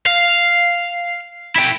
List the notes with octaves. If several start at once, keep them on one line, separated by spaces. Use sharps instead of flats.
F5
E4 G5